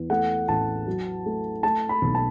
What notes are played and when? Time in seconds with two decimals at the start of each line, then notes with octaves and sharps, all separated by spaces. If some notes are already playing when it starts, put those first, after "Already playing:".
Already playing: E2
0.10 A3 F#5
0.48 A1 A5
0.87 F#3
1.26 A3
1.63 A3 A5
1.89 B5
2.02 B1
2.15 A5